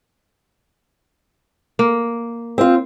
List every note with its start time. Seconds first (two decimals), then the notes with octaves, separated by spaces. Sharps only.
1.79 A#3
2.58 C4 F4